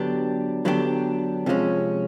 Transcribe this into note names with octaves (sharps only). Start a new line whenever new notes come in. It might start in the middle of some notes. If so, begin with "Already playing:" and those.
Already playing: D3 F#3 B3 D4 G4
D3 F#3 B3 D4 G4
C3 F3 G#3 C#4